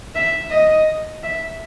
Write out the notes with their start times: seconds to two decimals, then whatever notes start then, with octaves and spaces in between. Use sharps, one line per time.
0.15 E5
0.50 D#5
1.23 E5